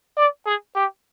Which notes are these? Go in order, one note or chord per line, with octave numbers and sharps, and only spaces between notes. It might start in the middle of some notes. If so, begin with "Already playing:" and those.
D5
G#4
G4